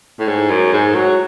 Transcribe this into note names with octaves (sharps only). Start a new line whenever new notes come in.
A2
G#2
F#2
G#2
F#3